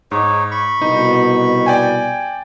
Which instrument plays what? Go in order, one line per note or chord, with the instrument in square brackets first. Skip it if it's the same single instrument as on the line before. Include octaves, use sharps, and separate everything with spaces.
[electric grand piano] G#2 [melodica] D#4 C#5
[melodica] B5 C#6
[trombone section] C2 B2 [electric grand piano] D#4
[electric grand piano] D5 G5 G#5